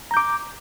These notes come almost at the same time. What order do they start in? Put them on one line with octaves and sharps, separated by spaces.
A#5 G6 D6